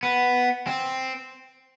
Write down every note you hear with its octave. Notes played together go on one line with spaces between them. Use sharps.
B3
C4